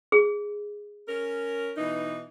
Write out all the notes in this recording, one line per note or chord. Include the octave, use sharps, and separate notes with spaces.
G#4
C#4 A#4
B2 E3 D#4